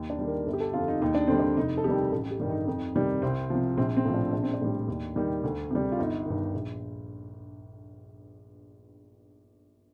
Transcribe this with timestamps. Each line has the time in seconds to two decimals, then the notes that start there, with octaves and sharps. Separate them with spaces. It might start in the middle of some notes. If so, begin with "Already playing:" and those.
Already playing: D#2
0.10 D4
0.19 D#3 G3
0.27 A#4
0.46 G1 A4
0.53 G4
0.60 A4
0.74 F2 D3 F3 F4
0.88 D#4
1.02 D#2 D#4
1.15 D4
1.27 D3 G3 C4
1.39 D4
1.57 F1 D#4
1.77 A4
1.84 F2 D#3 G3 G4
2.12 A1 A4
2.31 G4
2.40 G2 D#3 G3
2.49 D#4
2.67 F2 D#4
2.95 C3 D#3 G3
3.22 C2 C4
3.50 C3 F3
3.77 A#1 C4
3.97 C4
4.05 A2 F3
4.14 D4
4.33 A#1 D4
4.43 C4
4.53 D4
4.61 A2 G3
4.88 D#2
5.16 D#3 G3
5.44 D2
5.71 C3 G3
5.92 F4
5.99 G1 D#4
6.25 G2 D#3
6.54 A#1